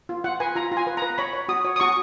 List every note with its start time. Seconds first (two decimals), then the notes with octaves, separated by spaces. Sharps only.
0.09 F4
0.24 F4 F#5
0.40 B4 G#5
0.56 F4 A#5
0.72 F4
0.77 G#5
0.87 B4
0.97 B4 A#5
1.18 C#5 B5
1.33 C#5
1.49 F#4 D#6
1.65 C#5
1.76 D#6
1.80 F#4 C#6